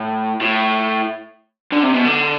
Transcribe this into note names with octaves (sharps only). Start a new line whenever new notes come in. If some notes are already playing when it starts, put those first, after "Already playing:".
Already playing: A2
A2
D3
C3
B2
D3